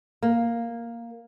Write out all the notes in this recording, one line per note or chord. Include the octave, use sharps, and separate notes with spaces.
A#3